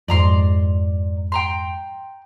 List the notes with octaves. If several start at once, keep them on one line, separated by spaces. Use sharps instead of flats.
F2 G#2 D5 A#5 C6
G5 A#5 C6